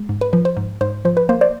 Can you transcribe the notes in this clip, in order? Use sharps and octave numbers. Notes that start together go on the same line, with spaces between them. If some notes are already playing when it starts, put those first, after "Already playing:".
Already playing: G#3
G#2
B4
F3 B4
C5
G#2
G#2 C5
F3 C5
B4
A#3 C5
C5 D5